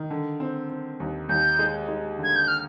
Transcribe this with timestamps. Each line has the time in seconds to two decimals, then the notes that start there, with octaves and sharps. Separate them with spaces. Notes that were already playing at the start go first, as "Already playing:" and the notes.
Already playing: D#3
0.10 D3
0.40 C4
0.70 C4
1.00 D#2
1.29 D#2 G6
1.59 G#3
1.88 G#3
2.19 D3
2.24 G#6
2.36 G6
2.48 F6